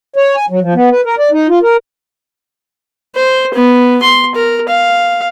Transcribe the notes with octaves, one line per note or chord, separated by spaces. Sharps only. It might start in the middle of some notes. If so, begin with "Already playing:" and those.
C#5
G#5
F#3
F3
B3
B4
A#4
D5
D#4
F4
A#4
C5
B3
C6
A#4
F5